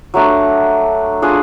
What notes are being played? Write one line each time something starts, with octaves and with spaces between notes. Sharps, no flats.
F#3 A3 D4
D4 F4 G#4